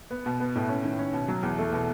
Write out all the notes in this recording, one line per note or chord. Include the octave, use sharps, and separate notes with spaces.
B3
B2
B3
A2
C#4
D#3
C#4
B2
F#3
E2
A3
B2